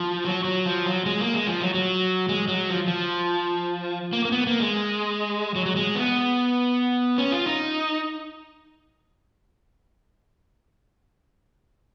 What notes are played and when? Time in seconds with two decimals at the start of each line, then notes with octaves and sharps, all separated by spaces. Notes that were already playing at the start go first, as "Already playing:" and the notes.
Already playing: F3
0.25 F#3
0.44 F#3
0.66 F3
0.86 F#3
1.06 G#3
1.20 A#3
1.34 G#3
1.47 F3
1.61 F#3
1.74 F#3
2.29 G#3
2.48 F#3
2.70 F3
2.88 F3
4.13 A#3
4.25 A#3
4.32 B3
4.47 A#3
4.60 G#3
5.55 F#3
5.66 F#3
5.76 G#3
5.95 B3
7.18 C#4
7.32 F4
7.46 D#4